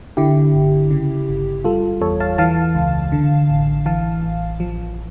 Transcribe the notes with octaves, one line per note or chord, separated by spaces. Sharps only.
D3 E4 G4
G1
C#3
G1
G3 F4 A4
E2 A4 C#5
F5 A5
E3 F5 A5
C#2
D3
A1
E3 F5 A5
A1
F3